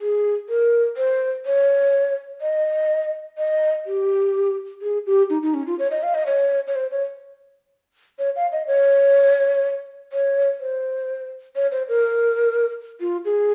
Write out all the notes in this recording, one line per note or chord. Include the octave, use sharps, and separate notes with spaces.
G#4
A#4
C5
C#5
D#5
D#5
G4
G#4
G4
D#4
D#4
C#4
F4
C#5
D#5
F5
D#5
C#5
C#5
C5
C#5
C#5
F5
D#5
C#5
C#5
C5
C#5
C5
A#4
F4
G#4